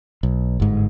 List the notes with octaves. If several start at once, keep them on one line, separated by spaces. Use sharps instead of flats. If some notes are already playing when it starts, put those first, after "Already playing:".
B1
G1 G#2